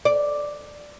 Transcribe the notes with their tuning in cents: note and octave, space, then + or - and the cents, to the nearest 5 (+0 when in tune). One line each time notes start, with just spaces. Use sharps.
D5 +0